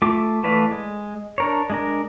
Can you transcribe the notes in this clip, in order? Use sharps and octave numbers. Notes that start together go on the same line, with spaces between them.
A3 F4 D6
E3 A3 B4 D5 F5
G#3
D4 A#4 C#5
G#3 D4 A#4